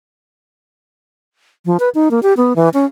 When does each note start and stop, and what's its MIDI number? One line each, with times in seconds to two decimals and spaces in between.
1.66 1.77 53
1.80 1.89 71
1.95 2.09 63
2.11 2.20 58
2.23 2.33 67
2.37 2.56 59
2.56 2.69 52
2.74 2.85 61